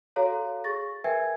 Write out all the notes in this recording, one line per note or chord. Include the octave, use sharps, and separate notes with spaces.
F#4 A4 C#5 F5 A#5
G#4 C#6 A6 A#6
A#4 B4 E5 G5 G#5 G#6